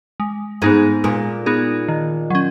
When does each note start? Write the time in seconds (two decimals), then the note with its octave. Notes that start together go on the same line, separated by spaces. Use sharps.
0.20 G#3
0.62 G#2 B3 D#4 G#4
1.04 A#2 G#3
1.46 B3 D#4 G#4
1.88 D#3
2.30 F#3 C#4